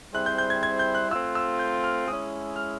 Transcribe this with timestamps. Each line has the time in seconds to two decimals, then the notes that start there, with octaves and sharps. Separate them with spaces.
0.13 G3 C4 E4 G#4 C5 F#6
0.26 G6
0.38 G6
0.50 G#6
0.63 G#6
0.79 G6
0.94 F#6
1.11 A3 C4 F4 E6
1.35 E6
1.59 G6
1.84 F6
2.08 G#3 D#6
2.11 C#4 E4
2.56 F6